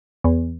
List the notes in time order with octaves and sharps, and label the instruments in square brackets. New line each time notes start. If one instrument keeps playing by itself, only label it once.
[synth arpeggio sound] E2